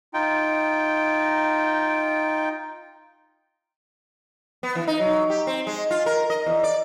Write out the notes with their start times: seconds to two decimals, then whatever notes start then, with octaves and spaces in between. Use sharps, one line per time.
0.14 D#4 F4 G5
4.63 B3
4.76 E3
4.87 D#4
5.00 F#3
5.30 G4
5.47 C4
5.67 G#3
5.91 F4
6.06 A#4
6.30 D#5
6.46 E2
6.64 D5